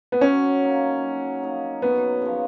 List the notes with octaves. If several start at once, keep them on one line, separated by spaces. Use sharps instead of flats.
B3
F#3 C#4
A#3 D#4 A#4
F#3
A#3 D#4 A#4
F#2 B3
C#3 F3